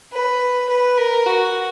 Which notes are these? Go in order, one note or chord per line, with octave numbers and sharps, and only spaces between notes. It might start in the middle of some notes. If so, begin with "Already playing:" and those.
B4
B4
A#4
F#4